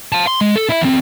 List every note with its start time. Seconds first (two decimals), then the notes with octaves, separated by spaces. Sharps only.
0.12 F5 A5
0.27 C6
0.41 G#3
0.56 A4
0.69 E4 E5
0.81 E2 C4